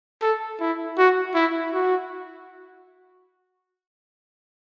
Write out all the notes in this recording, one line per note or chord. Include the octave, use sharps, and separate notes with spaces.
A4
E4
F#4
E4
F#4